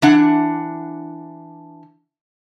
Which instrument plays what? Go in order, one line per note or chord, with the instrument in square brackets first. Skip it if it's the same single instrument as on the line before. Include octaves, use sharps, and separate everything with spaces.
[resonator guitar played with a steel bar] E3 D4 F#5